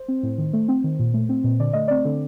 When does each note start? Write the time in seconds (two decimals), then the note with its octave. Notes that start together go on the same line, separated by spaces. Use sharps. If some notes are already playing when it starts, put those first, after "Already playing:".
Already playing: C5
0.08 C4
0.23 A2
0.38 D#3
0.53 A3
0.68 C4
0.84 D#3
0.99 A#2
1.14 A3
1.29 C4
1.44 A#2
1.60 D3 D5
1.73 A3 D#5
1.88 C4 D5
2.05 D3